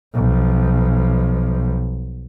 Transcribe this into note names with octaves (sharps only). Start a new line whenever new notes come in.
B1 F3